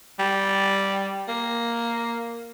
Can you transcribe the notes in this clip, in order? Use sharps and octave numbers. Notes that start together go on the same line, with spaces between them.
G3
A#3